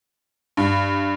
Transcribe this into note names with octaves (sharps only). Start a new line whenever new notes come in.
G2